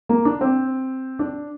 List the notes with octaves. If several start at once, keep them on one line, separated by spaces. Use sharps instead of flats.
A#3
D4
C4
D4